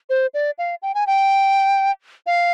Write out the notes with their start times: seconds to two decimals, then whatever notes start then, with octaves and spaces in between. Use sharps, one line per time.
0.10 C5
0.34 D5
0.58 F5
0.82 G5
0.95 G#5
1.07 G5
2.27 F5